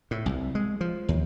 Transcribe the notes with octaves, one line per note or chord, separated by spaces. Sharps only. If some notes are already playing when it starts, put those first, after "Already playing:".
A2
C2
G#3
F3
D#2